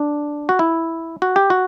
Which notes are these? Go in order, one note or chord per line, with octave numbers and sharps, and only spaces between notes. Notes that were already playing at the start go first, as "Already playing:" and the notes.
Already playing: D4
F#4
E4
F#4
G4
F#4